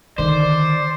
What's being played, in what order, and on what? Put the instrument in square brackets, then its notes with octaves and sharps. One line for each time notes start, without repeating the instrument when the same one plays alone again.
[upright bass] D3 D#3 [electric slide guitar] C5 [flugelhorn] D5